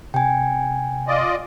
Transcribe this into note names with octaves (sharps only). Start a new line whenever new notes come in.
C3 G5 G#5
F4 D5 D#5